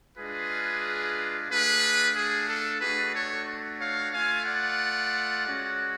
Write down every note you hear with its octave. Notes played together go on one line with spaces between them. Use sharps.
G#3 D4 F4 G#4 B4
A3 D4 F4 G#4 B4
G#4
A4
A3 D4 F#4 G#4 B4
A4 C#5
C#5 F5
A3 F4 F5 G#5
D5 F#5
G#3 C#4 F#4